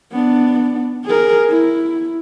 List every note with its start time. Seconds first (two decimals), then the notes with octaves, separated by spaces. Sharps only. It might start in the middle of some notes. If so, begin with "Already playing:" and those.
0.12 B3 D4
1.05 G#4 A#4
1.49 E4